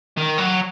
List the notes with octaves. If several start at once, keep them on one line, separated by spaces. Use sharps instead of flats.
D#3
F#3